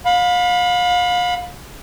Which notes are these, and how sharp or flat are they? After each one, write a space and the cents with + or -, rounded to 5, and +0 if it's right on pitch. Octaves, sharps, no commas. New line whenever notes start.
F5 +35 B5 +0